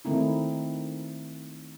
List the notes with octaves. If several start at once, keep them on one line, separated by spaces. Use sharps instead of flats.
D#3 A3 C4 D#4 E4